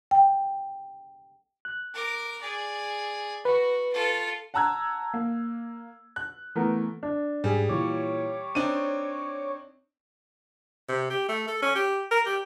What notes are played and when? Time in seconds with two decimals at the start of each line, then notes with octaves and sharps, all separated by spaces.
0.11 G5
1.65 F#6
1.94 A#4 D6
2.41 G#4 D5
3.45 F#4 B4
3.93 F4 A4
4.54 F#5 A5 A#5 E6 F#6 G#6
5.14 A#3
6.16 F#6
6.55 E3 A3 B3 A#4
7.03 D4
7.44 G#2 G3 G#4
7.69 A#2 E3 C#5 D6
8.55 C4 D4 D#4 D#7
10.89 C3
11.10 G4
11.29 A3
11.48 A4
11.62 C#4
11.76 G4
12.11 A#4
12.26 G4